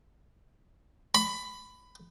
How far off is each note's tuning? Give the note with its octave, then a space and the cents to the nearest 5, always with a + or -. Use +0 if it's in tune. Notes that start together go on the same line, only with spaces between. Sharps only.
B5 +15